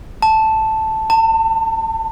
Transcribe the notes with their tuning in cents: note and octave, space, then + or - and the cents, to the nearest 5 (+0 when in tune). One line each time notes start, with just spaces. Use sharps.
A5 +0
A5 +35